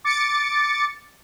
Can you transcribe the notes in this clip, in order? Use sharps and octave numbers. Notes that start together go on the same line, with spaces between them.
D6 A6 C#7